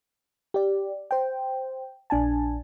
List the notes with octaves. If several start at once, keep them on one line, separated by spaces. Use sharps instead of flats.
G4 D5
C5 G5
A#1 D4 G#5 A5